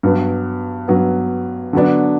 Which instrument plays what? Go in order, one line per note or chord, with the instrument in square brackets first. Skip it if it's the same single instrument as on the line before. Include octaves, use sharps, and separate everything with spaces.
[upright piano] G2 F#3 B3
G2 F#3 B3
D3 F#3 B3 D4